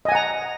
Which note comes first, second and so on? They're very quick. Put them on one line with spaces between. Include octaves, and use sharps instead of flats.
D#5 G#5 F#5 A#5